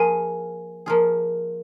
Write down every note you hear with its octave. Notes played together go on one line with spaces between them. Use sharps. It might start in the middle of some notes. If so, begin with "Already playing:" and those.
Already playing: F3 A#3 F4 G#4 G#5
F3 A#3 F4 G#4